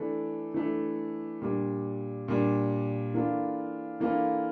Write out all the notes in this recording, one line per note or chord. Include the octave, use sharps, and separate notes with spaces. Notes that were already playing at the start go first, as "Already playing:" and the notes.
Already playing: E3 A3 D4 A4
E3 A3 D4 A4
A#2 G3 D4
A#2 G3 D4
E3 A#3 D4 F4 A4
E3 A#3 D4 F4 A4